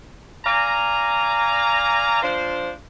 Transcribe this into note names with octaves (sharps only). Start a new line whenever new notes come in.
D5 F5 G#5 A#5
F3 D4 F4 C5